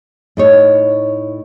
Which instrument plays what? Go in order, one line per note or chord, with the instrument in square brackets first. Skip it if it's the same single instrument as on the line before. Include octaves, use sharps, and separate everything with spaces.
[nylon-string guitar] A2 D#4 C#5